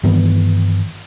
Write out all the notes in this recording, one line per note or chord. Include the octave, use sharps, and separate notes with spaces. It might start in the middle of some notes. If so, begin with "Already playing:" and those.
G2 D#3 E3 B3